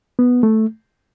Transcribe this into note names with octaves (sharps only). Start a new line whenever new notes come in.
B3
A3